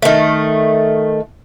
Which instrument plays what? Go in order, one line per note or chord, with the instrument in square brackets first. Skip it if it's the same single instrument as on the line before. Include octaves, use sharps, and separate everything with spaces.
[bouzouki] D#3 A3